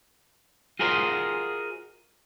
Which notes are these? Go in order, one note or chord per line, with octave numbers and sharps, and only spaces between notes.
F4 F#4 G#4 A#4 C5 D#5